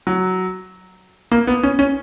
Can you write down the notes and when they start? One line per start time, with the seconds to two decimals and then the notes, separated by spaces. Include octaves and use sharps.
0.07 F#3
1.32 A#3
1.47 B3
1.63 C#4
1.79 C#4